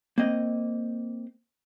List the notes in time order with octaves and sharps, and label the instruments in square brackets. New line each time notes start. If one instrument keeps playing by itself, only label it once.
[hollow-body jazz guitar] A#3 C4 D#5